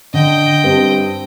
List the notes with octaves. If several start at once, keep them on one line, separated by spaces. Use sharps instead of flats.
D3 D#5 G5
G2 C4